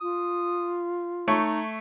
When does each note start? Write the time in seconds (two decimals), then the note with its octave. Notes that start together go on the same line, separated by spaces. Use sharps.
0.01 F4 D#6
1.28 A3 D#4 C#5